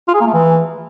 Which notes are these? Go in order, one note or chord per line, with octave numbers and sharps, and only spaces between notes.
F4
G#4
A#3
A3
E3